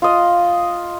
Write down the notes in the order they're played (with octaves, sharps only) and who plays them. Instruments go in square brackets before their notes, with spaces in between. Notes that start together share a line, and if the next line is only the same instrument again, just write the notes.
[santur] F4 D#5